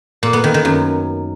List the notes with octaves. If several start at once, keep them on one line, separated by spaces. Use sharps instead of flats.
A#2
B3
D#3
D#3
F#2